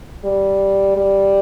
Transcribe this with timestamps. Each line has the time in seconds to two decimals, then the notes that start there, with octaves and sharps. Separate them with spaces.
0.25 G3
0.96 G3